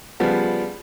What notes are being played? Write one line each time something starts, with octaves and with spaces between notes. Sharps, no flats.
C#3 F3 G3 B3